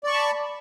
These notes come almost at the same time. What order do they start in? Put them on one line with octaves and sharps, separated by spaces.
D5 C#6 A5 B5